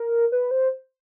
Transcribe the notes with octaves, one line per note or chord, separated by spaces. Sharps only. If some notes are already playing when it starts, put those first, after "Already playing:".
Already playing: A#4
B4
C5